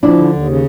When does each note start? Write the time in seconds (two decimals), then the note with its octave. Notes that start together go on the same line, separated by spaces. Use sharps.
0.03 F3 D4 E4
0.18 D3
0.33 D#2
0.48 C#3